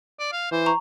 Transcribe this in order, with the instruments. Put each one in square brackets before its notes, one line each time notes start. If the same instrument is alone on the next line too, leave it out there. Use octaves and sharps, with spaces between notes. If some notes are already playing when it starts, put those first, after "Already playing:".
[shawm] D5
F5
[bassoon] E3 [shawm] C5
[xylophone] A#5 C#6